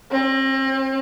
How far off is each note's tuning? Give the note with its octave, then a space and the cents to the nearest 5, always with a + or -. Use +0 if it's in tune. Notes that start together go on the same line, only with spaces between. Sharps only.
C4 +40